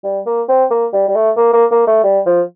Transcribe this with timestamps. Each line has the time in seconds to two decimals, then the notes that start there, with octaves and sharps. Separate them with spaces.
0.04 G3
0.26 A#3
0.49 C4
0.70 A#3
0.93 G3
1.08 G3
1.15 A3
1.37 A#3
1.53 A#3
1.71 A#3
1.87 A3
2.04 G3
2.26 F3